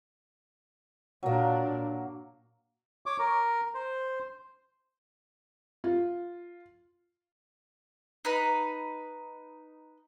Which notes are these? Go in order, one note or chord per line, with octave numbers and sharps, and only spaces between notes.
A#2 F#3 A#3 D4
C#5 D6
A#4
C5
F4
D#4 B4